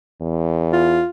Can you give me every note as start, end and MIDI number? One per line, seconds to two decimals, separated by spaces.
0.21 1.01 40
0.73 1.08 65